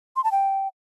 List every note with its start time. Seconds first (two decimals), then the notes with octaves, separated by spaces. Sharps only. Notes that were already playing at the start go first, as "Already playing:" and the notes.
0.16 C6
0.24 A5
0.32 G5